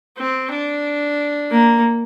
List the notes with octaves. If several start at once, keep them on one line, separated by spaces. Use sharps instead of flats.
C4
D4
A#3